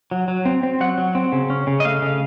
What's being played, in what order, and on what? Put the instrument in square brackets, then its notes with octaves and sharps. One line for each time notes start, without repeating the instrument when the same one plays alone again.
[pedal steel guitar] F#3
F#3
C4
C4
F#3 F#5
F#3
C4
C#3
C#4
C#3
D#5
A3 F5
C#3